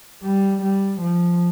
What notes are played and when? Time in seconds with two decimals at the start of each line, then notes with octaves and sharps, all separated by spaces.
0.23 G3
0.63 G3
1.01 F3